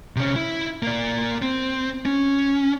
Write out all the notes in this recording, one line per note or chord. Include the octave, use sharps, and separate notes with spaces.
C3 C#4
E4
A#3 D5
C4
C#4